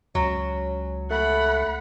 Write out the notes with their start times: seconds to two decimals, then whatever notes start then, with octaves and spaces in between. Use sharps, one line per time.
0.15 C#2 F#3 C#4
1.10 A3 F#5 B5